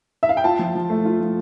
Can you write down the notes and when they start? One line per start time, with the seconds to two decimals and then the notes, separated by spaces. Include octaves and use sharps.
0.23 E5
0.29 F5
0.37 G5
0.44 F4 A5
0.59 F3
0.75 F3
0.90 A3
1.05 F4
1.20 F3